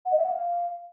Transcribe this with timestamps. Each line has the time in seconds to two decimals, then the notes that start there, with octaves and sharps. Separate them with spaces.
0.05 F#5
0.11 D#5
0.17 E5
0.23 F#5
0.29 F5